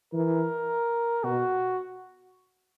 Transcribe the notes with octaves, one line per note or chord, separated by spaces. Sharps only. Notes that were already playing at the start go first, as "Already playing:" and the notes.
E3 A#4
B2 F#4